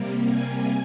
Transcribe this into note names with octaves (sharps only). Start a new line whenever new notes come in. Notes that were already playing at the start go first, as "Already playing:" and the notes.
Already playing: C3 G3 A#3
G#5